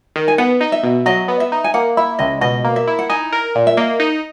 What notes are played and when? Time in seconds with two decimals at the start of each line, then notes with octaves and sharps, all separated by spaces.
0.16 D#3
0.28 G#5
0.38 B3 F#5
0.61 D#4
0.72 E5
0.83 B2
1.06 F#3 D#5
1.28 B3
1.40 E5
1.52 D#4
1.64 G#5
1.74 A#3 F#5
1.97 E4 E5
2.19 C#2 D#5
2.41 B2 D#5
2.65 A#3
2.76 E5
2.87 E4
2.99 F#5
3.09 D#4 G#5
3.33 A#4
3.55 A#2
3.67 E5
3.77 A#3 D#5
4.00 D#4